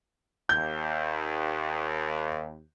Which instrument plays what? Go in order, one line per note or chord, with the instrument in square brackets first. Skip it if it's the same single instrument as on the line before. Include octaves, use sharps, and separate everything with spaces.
[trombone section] D#2 [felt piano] G6